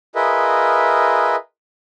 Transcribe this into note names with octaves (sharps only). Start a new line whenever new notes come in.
F4 G#4 A#4 B4 D#5 E5